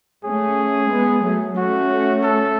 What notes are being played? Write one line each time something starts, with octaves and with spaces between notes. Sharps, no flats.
A3 C#4 G#4
G#3 B3
F#3 A3
A3 C#4 F#4
A4